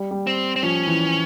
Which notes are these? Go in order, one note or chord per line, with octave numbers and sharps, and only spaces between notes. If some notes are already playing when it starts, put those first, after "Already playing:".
Already playing: G3
G3
C4
C4
F3 C#4
E3